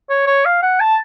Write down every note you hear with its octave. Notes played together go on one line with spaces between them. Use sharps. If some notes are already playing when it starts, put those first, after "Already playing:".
C#5
C#5
F5
F#5
A5